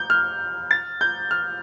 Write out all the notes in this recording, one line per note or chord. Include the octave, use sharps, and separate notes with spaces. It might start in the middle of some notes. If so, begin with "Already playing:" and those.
Already playing: G6
F6
A6
G6
F6